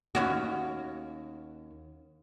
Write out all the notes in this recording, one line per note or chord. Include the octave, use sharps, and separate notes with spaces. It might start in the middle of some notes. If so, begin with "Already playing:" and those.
D#2 C#4 F#4